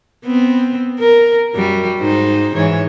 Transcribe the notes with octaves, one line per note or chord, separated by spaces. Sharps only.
B3 C4
A#4
F#2 G3 F#4
G#2 D#4 C5
G#2 E3 C#5